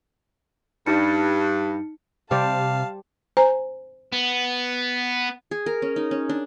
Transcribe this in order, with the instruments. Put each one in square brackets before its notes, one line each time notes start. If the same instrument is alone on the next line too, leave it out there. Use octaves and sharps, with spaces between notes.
[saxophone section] G2 [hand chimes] D#4 C#7
[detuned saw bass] C3 [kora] G3 C5 D5 [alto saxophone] F5 [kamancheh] A5
[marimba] C5 G#5 A#5
[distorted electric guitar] B3
[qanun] G#4
A#4
C#4
D#4
C#4
D4